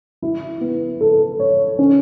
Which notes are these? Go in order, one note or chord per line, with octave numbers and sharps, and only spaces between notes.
E4
B3
A4
C#5
C#4